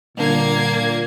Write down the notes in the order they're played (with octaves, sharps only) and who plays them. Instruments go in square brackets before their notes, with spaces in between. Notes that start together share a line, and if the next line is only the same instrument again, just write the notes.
[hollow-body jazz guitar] G2 D3 [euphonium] A#2 [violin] A#3 G#6